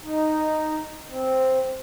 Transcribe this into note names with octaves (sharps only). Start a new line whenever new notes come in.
D#4
C4